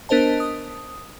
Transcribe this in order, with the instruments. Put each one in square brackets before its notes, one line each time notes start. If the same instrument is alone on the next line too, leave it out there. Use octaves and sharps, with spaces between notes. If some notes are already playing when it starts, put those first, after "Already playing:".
[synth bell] B3 D4 A#4 C5 D#5 A5
D#6